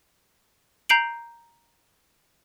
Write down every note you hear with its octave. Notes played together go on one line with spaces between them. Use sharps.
A#5 G6 C7 D7 F#7